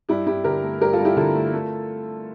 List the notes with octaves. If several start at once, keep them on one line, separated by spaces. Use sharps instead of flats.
G2 E4 G4
G2 E4 G4
D3 G4 A#4
A3
G2 G4 A#4
F4 A4
G2
E4 G4
D3 F4 A4
A3
A3